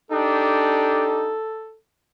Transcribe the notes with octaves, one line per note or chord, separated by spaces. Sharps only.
D4 D#4 G4 A4